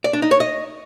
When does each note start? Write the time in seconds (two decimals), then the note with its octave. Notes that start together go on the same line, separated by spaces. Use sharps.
0.04 D5
0.13 D4
0.22 D#4
0.31 C#5
0.40 D#5